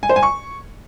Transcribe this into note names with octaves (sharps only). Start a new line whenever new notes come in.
G#5
C5
G#5
C#6